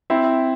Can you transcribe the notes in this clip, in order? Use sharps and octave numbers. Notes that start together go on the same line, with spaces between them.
C4 E4